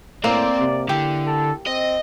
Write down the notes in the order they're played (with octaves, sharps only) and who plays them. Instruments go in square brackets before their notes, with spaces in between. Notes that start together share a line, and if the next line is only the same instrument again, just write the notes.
[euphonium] A2 [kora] A#3 [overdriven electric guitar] C4 [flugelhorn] D5
[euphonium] C3
[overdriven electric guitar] D3 [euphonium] E4 [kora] G4
[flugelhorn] A4
[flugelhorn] C4 [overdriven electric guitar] D#5